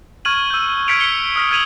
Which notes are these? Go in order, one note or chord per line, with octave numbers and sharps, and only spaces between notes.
C#6 F6 G#6 D#7 F#7
E6 G6
F6 G#6 B6 C#7 D7 F7
C#7 G7
D#6 F6 B6
F6 G#6 D#7 F7 F#7